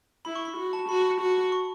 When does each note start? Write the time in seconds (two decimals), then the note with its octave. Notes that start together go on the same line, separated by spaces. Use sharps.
0.25 E4 B5
0.35 C#6
0.45 B5
0.57 F#4
0.73 A5
0.89 F#4 B5
1.21 F#4
1.52 C#6